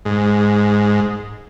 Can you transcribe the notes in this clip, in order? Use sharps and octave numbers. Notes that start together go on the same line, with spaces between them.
G#2